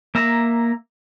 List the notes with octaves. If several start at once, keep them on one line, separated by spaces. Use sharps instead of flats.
A#3 E5 A#5